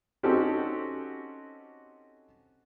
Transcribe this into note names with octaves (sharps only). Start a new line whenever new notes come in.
C4 C#4 D#4 F#4 G4 A4